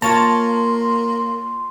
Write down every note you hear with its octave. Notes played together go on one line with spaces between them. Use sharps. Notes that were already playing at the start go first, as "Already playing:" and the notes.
A#3 F4 C#5 A5 A#5 C6